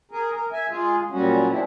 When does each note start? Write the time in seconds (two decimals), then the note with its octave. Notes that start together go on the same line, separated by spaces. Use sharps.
0.11 G#4 A#4
0.33 A#4
0.52 E5 G#5
0.70 G#3 F4 G#4
1.10 A#2 F#3 G3 C#4 F#4
1.49 G#3 C4 D4 E4